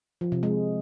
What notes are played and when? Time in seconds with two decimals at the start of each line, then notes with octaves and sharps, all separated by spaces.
0.21 F3
0.32 C3
0.43 G#3